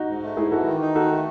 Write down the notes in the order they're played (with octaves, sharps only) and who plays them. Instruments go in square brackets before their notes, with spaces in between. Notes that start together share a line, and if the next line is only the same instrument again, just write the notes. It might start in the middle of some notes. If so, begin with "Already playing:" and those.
Already playing: [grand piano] D#4 F#4
[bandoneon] G#2
A3
[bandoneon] G#2 [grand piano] E4 G#4
[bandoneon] E3 [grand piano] F#4 A4
[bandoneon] D#3
D#4
[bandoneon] D#3 [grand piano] F#4 A4
[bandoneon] A3